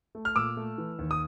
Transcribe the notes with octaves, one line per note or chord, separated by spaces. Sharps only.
A3
F6
A#2 D6 E6
A3
E3
D#2
D#6